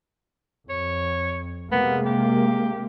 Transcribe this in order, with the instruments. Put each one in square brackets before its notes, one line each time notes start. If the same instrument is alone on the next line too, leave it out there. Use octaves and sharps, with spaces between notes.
[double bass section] F2 [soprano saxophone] C#5
[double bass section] C3 G#3 A#3 [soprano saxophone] B3
[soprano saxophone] G4